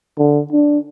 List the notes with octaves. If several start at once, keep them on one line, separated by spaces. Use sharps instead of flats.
D3
D4